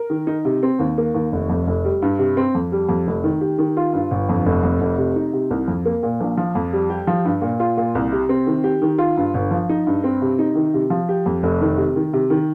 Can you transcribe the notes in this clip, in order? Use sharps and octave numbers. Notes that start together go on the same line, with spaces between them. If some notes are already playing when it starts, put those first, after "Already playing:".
Already playing: A#4
D#3
D#4
C3
C4
D#2
A#3
D#2
F1
F2
F1
G3
G2
C3
C4
F2
G3
F2
F1
D#3
G4
D#3
F4
G2
G1
F2
F1
F2
F1
C3
D#4
C3
C2
F2
A#3
A#2
A#1
F3
F2
G3
G4
F3
G2
A#2
F4
A#2
C2
C3
C4
D#3
G4
D#3
F4
G2
G1
F3
D#4
G2
C4
C3
D#4
D#3
C3
F3
G4
F2
F1
D#3
C3
D#3
C3
D#3